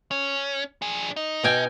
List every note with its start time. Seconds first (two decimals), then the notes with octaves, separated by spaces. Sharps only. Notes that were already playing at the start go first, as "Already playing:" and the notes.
0.11 C#4
0.82 D4 G#4
1.16 D#4
1.43 B2 G5 G#5